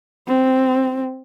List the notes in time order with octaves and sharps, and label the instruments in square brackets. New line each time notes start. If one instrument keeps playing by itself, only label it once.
[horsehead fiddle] C4